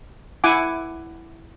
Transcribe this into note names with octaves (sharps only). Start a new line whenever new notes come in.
E4 F#5 G#5 D6